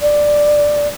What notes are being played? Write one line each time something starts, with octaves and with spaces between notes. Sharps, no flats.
D5